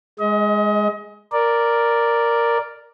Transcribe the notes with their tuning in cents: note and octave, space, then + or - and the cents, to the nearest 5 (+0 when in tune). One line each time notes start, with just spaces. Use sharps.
G#3 +0 D#5 +30
A#4 +0 D5 +0